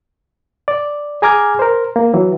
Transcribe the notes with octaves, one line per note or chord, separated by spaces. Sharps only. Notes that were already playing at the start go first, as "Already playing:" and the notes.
D5
G#4 G#5 A#5 D6 F6 G#6
A#4 C5
A#3
E3 F#3